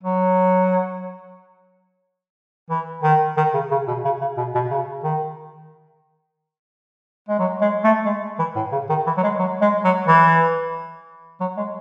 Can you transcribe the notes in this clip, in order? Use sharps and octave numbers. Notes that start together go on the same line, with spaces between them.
F#3
E3
D#3
D#3
C#3
C#3
B2
C#3
C#3
B2
B2
C#3
D#3
G#3
F#3
G#3
A3
G#3
E3
A2
C#3
D#3
E3
F#3
G#3
F#3
G#3
F#3
E3
F#3
G#3